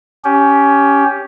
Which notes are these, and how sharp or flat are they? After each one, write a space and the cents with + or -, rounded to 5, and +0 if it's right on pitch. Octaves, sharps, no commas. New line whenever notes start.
C#4 +15 G4 +0